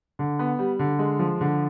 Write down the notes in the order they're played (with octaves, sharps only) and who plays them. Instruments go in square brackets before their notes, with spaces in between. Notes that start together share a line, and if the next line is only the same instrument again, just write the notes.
[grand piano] D3
B3
G3
D3
G#3
F3
D3